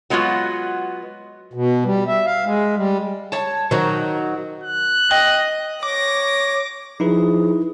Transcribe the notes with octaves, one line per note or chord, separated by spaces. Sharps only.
F#3 G#3 B3 F4 F#4
B2
G3
E5
F5
G#3
G3
C#5 A5
D#3 F#3 F#4 C5
F#6
D#5 G5
C#5 D6 A#6
F3 D#4 E4 G#4 B4